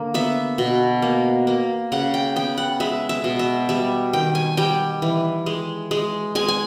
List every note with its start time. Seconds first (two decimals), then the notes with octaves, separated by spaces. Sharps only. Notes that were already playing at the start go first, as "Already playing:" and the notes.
Already playing: D3 A#3
0.14 B3 E5
0.58 B2
1.02 A#3
1.47 A#3
1.92 C#3 F#5
2.14 G5
2.36 B3 G5
2.58 F#5
2.80 G#3 E5
3.09 E5
3.24 B2
3.39 E5
3.69 G3 E5
4.13 D#3 G5
4.35 G#5
4.57 G3 G5
5.02 E3
5.46 G#3
5.91 G#3
6.35 G#3 G#5
6.48 G#5